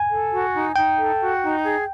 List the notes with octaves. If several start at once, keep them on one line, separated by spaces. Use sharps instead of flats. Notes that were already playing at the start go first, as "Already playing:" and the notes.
Already playing: G#5
A4
F#4
D#4
D#4 G5
A4
F#4
D#4
G#4